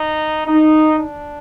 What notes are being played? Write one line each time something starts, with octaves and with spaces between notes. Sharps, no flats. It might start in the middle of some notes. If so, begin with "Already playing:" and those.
Already playing: D#4
D#4
D4